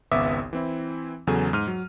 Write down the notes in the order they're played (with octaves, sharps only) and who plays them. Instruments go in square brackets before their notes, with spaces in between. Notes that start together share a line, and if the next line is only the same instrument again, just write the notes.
[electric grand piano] G#1 C#2 B3 E5 D6 D#6
E3 C4 E4
E2 C#3 F#3 A4 G#5
G#2 F6 D#7
F#3